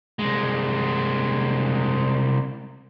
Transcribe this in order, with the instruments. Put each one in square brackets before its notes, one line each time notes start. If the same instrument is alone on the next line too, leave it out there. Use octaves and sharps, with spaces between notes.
[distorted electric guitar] C2 G#3